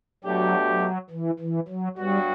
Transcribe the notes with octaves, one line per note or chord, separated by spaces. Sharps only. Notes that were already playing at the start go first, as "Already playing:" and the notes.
B2 F#3 A3 D4 G4
F#3
E3
E3
F#3
G2 F#3 G3 B3 F#4